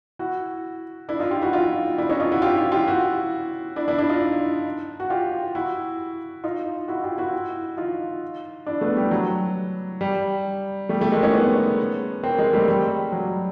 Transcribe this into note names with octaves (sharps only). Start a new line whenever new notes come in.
E4 F#4
D4 E4
D#4 F4
F4 G4
E4 F#4
D#4 F4
D4 E4
C#4 D#4
D#4 F4
E4 F#4
F4 G4
F4 G4
F4 G4
E4 F#4
D4 E4
D4 E4
D4 E4
D#4 F4
F#4
F4 G4
E4 F#4
D#4 F4
E4 F#4
F4 G4
E4 F#4
D#4 F4
D4 E4
A3 B3
G3
F#3
G3
G3 A3
G3 A3
G#3 A#3
C#4 D#4
B3 C#4
A#3 C4
G#3 A#3
G3 A3
G3
F#3